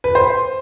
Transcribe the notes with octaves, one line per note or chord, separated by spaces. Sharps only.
B4
C5